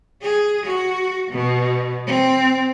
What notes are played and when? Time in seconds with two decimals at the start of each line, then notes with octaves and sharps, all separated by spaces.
0.22 G#4
0.66 F#4
1.31 B2
2.07 C4